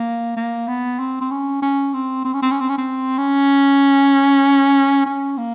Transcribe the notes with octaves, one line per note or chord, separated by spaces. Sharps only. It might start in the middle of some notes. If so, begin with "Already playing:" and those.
Already playing: A#3
A#3
B3
C4
C4
C#4
C#4
C4
C4
C#4
C4
C#4
C4
C#4
C4
C#4
C#4
A#3